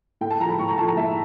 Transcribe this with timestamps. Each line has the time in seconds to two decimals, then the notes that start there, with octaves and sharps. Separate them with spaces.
0.21 A2 G5
0.31 A5
0.40 F3 A3 A#5
0.49 B5
0.59 A2 C#6
0.68 A#5
0.78 F3 A3 A5
0.87 A#5
0.97 A2 E5